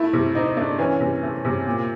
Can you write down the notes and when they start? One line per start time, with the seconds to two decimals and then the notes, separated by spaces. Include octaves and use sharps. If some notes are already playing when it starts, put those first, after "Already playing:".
Already playing: A3 E4
0.13 C3
0.35 C4 D#4
0.57 A3 D4
0.79 E3 C#4
1.00 C3
1.22 A3
1.45 C3
1.66 A#2